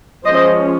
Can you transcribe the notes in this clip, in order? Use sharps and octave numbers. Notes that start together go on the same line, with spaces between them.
F3 G#3 C#4 C5 D#5